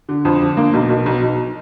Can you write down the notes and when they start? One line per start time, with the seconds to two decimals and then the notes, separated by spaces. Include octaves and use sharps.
0.09 D3
0.25 F2
0.41 D3
0.57 A#3
0.73 B1
0.90 B1
1.06 B1
1.22 B1